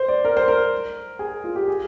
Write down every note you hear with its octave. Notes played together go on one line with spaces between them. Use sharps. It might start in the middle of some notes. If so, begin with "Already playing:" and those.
Already playing: C5
D5
A#4
C5
A#4
G#4
F4
G4
G#4